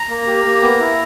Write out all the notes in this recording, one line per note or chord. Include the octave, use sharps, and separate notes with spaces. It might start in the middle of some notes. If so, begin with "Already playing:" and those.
Already playing: A#5
A#3
G4
A#3
B3
E4